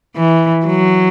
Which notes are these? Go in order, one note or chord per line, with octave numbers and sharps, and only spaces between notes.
E3
F#3